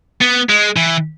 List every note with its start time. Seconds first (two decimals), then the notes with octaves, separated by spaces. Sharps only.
0.21 B3
0.50 G#3
0.77 E3